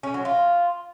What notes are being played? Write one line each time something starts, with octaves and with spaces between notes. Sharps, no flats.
C#4
F#3
F4